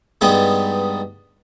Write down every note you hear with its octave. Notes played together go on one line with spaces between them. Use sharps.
G2 G3 G#3 B3 D#4